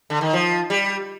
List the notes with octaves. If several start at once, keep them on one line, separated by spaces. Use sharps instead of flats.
D3
D#3
F3
G3